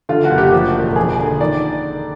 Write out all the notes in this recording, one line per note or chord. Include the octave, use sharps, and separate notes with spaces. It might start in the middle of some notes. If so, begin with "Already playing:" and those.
D3 F4
F#4
F#1
G4
F3 G4
E1
F3 G#4
D3
D#3 D5